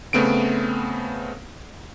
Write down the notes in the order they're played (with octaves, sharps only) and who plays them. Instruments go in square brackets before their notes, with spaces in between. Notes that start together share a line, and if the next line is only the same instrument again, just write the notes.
[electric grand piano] C#3 A3 B3 C4 D7